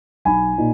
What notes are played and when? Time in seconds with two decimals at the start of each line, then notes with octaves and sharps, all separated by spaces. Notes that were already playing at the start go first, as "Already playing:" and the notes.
0.25 B1 G#5 B5
0.58 A#2 D#4